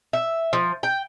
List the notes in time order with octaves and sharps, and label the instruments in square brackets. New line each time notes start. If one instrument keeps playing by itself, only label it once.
[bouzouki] E5
F3
G5